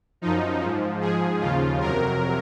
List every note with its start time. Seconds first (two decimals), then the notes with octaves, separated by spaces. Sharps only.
0.21 F#2 F3 D#4
0.61 G#2 F3
1.01 G#2 F3 G#4
1.40 D#2 C#3 F3 F4
1.80 F2 C3 F#3 A#4